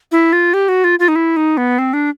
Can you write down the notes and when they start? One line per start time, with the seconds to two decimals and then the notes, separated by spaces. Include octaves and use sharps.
0.12 E4
0.33 F4
0.54 G4
0.69 F#4
0.84 F4
0.99 F4
1.08 D#4
1.16 E4
1.37 D#4
1.57 B3
1.79 C4
1.93 D4